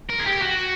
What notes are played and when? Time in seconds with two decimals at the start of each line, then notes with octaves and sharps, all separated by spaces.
0.10 A#4
0.20 G#4
0.26 G4
0.41 F#4